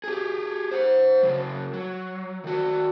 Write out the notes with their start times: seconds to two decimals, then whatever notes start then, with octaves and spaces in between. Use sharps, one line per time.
0.04 G4 G#4
0.71 C5 F#5
1.23 C#3 F#3
1.73 F#3
2.44 D#3 F#4